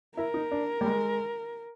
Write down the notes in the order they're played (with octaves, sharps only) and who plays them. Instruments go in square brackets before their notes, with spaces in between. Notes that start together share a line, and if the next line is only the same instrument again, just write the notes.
[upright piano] E4 [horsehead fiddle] A#4
[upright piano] D#4
D4
G3
G#3